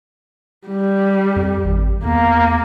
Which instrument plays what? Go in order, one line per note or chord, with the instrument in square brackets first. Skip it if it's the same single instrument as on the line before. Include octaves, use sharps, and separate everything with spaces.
[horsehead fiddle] G3
[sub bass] F2
G#1
[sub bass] E2 [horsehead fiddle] A#3